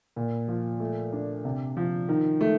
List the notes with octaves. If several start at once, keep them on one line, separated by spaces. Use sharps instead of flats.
A#2
F3
A3
D4
C3
F3
D#3
A3